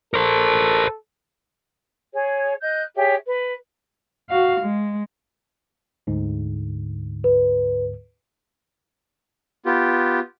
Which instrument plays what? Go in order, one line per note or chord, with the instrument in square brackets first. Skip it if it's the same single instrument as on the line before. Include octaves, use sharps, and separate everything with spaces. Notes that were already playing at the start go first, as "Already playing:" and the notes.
[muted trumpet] A4 [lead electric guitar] A#4 C5
[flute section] G#4 C#5
D#5 F#6 G6
G4 G#4 C#5 E5
B4
[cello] F#4 F5
G#3
[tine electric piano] D2 G#2 D3
[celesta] B4
[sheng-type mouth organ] B3 F4 G4